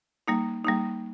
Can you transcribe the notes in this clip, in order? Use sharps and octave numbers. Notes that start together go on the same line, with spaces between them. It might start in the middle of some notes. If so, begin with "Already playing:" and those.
G3 A#3 D#4
G3 A#3 D#4